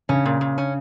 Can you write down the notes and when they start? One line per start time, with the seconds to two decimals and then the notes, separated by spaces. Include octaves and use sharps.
0.09 C#3 C#4
0.25 A#2
0.41 A#2
0.58 C#4